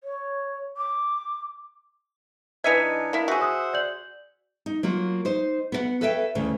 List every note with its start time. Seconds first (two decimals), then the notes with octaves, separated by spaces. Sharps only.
0.04 C#5
0.77 D6
2.64 E3 D4 D#4 D#5 E5 G#6 C#7
3.13 A#3 E4
3.28 F#4 G#4 C5 E5 F#5
3.42 D#6
3.73 D5 G6 F#7
4.66 D#4
4.83 F#3 A#3 F4
5.25 D#4 C5
5.72 B3 C5 F#5
6.01 A4 B4 C#5 E5 F5 G5
6.35 D2 C#3 E3